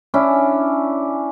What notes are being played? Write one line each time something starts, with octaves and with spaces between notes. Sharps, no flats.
C#4 D4 E4